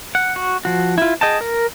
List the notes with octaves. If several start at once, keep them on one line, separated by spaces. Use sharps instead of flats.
F#5
F#4
F3 F#4
E4 F4
G#4 D#5 G5 A5
A#4